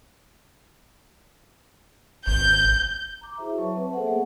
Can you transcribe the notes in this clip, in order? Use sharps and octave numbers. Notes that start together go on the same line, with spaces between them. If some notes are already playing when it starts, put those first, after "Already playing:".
G#1 G6
A#5 D6
E4 F#4 G#4 C5 E5
F#3 B4 C#5 E5 A5 C#6
C4 B4 A5
A#3 G#4 A4 C5 E5 F#5
A3 B3 G#4